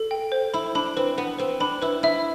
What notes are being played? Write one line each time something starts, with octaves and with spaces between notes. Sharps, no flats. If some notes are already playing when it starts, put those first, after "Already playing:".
Already playing: A4
G5
C5
E4 B5
D4 B5
C4 B4
B3 B4
C4 B4
D4 B5
E4 B4
E4 E5